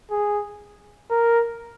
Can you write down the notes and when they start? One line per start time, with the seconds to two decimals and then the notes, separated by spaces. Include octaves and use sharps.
0.11 G#4
1.11 A#4